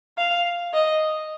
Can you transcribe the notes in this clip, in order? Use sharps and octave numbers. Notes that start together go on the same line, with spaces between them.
F5
D#5